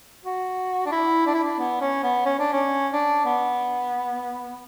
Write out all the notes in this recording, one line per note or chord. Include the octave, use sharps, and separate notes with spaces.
F#4
D4
E4
D4
E4
D4
B3
C#4
B3
C#4
D4
C#4
D4
B3